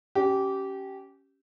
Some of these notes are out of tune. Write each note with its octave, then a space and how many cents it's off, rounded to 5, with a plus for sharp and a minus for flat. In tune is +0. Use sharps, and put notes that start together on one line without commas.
C#4 +0 G4 -20